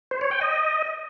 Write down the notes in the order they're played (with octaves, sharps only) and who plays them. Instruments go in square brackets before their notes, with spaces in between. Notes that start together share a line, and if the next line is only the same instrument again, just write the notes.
[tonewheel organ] C5
C#5
G5
D#5